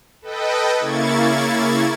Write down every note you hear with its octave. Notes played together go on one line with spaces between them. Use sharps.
A4 B4 D#5 G5
C#3 A#3 E4 C#6 G#6 A6